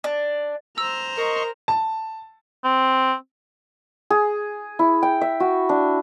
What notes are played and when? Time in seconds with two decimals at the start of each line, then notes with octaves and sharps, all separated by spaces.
0.04 D4
0.78 C5 A#5 E6
1.17 A#4 D#5 C6 C#6
1.68 A5
2.64 C4
4.10 G#4
4.79 E4
5.03 G5
5.21 E5
5.40 F#4
5.69 D4